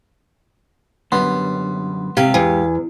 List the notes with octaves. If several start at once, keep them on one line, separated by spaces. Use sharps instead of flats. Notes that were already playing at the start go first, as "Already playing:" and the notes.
F#2 D3 G3 B3 C6
G#2 C3 G4 F5
E2 G#5